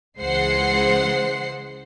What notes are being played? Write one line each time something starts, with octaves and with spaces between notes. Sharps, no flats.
C#2 E3 G#3 C5 F#5 C7